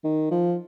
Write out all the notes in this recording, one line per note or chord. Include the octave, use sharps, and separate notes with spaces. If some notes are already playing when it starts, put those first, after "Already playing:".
D#3
F3